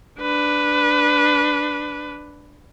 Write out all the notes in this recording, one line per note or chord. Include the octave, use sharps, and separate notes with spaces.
D4 B4